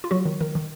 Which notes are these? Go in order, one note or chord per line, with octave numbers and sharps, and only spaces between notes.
F4
F#3 F#4
D#3
D#3 A#4
D#3